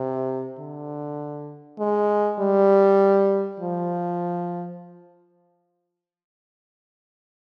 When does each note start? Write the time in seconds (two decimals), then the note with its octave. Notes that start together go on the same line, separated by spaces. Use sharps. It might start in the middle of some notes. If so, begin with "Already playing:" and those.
Already playing: C3
0.59 D3
1.79 G#3
2.40 G3
3.60 F3